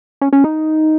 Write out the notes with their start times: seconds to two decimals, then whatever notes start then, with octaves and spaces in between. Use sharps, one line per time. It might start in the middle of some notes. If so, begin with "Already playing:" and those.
0.21 C#4
0.33 C#4
0.44 D#4